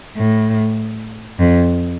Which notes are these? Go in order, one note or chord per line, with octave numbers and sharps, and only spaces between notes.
A2
F2